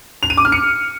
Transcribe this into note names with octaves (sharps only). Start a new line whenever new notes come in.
F7
D#7
D6
F6
C#7